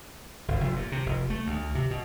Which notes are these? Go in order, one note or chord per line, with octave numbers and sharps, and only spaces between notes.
G1
F1
A#2
C3
F1
A3
D2
C3
B2